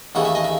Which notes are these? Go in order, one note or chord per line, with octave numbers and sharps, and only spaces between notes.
D#2 C#3 E3 A3 F#5
E5
D#5
E5